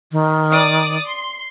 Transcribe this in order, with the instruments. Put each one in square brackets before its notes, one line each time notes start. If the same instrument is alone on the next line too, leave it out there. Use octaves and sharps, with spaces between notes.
[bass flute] D#3
[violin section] D5 D6 D#6
C6